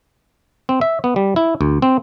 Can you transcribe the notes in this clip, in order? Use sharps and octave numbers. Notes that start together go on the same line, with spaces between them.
C4
E5
B3
G3
E4
D2
C4